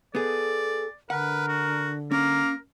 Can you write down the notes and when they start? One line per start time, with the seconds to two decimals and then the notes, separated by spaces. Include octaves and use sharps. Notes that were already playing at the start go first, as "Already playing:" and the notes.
0.15 B3 G#4 A4 D5
1.10 D3 A#4 B4 F#5
1.48 F#4
2.11 A#3 C#4 A#4